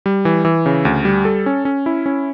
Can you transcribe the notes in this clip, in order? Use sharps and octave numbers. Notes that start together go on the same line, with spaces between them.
G3
E3
E3
C#3
D2
G3
A4
C#4
C#4
E4
C#4